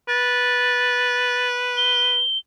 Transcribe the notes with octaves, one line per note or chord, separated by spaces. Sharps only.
B4 A6
G7